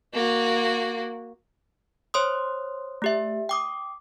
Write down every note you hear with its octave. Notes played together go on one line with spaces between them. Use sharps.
A#3 F#4
C5 C#5 C6 D#6
A3 G4 E5
G5 D6 D#6